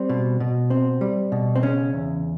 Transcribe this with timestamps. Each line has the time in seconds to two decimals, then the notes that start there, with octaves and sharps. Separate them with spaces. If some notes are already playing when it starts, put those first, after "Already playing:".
Already playing: G3 C4
0.09 B2
0.40 B2
0.70 C4
1.01 G3
1.32 B2
1.56 C4
1.63 C#3 C#4
1.93 E2